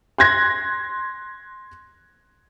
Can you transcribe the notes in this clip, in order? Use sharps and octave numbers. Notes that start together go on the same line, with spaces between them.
C6 F#6 G#6 A#6